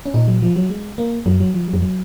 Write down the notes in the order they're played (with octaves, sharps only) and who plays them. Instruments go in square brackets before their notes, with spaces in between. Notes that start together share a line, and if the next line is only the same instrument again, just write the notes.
[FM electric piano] C#4
[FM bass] A#2 [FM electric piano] D#4
[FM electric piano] F#3
F3
F#3
G#3
A#3
[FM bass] F#2 [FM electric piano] F#3
[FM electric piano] F#3
F3
F#3
[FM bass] F2
[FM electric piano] F#3